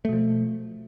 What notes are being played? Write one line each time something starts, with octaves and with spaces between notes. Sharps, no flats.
B2 F3 A3